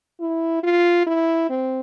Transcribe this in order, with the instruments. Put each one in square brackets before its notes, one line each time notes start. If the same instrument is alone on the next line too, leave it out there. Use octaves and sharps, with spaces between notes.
[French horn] E4
F4
E4
C4